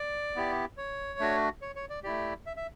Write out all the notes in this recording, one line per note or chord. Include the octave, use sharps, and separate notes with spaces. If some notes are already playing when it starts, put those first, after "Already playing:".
Already playing: D5
B3 E4 G4
C#5
A3 D4 F#4
C#5
C#5
D5
A3 E4 G4 D5
E5
E5